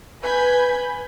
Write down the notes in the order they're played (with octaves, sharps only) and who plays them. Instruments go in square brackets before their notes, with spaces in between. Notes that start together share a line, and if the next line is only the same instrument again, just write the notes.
[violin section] B4 G#5 B5 G6 G#6 B6